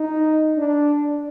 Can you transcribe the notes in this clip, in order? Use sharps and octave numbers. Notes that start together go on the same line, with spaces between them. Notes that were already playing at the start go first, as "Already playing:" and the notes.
Already playing: D#4
D4